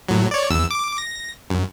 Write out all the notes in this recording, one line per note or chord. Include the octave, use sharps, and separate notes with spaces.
A2 F#3
C#5 D5
E2 E6
D6
A#6
F#2